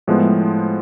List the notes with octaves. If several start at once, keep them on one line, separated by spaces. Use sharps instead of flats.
A2 F3 G#3 B3